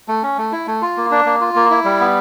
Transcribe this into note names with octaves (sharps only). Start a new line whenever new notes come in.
A3
C#4
A3
E4
A3
F4
A#3
D4
A#3
F4
A#3
E4
G3
B3